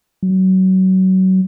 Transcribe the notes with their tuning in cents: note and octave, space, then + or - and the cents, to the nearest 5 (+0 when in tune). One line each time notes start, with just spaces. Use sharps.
F#3 +25